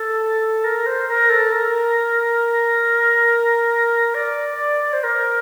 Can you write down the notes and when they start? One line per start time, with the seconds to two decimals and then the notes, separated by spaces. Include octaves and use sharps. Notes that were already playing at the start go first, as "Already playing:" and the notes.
Already playing: A4
0.64 A#4
0.86 C5
1.09 A#4
1.30 A4
1.52 A#4
4.15 D5
4.93 C5
5.03 A#4